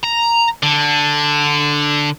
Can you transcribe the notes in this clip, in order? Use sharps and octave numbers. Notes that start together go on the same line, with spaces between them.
A#5
D3